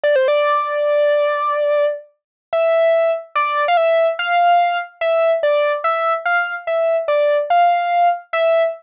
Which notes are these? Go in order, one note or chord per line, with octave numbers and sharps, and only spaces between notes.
D5
C5
D5
E5
D5
F5
E5
F5
E5
D5
E5
F5
E5
D5
F5
E5